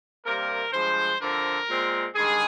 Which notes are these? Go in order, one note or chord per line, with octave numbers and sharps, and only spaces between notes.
C3 G3 A#3 A#4
G2 F3 G#3 C5
D3 F3 C4 A#4
A#2 G#3 C4
G2 D#3 G#3 G#4